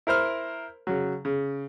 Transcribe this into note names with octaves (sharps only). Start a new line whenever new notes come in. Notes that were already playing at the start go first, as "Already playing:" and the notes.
E4 A#4 C5 F6
C#3 F#3
C#3